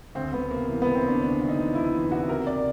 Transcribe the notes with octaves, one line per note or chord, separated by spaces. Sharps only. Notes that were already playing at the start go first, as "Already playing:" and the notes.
D2 C4
D2 B3
C3 A#3
E3
B3
C3
C4
D2 D4
D2 D4
D2
D#4
E3
D2 E4
E3
C3 F#4
C3 A#4
C3 D5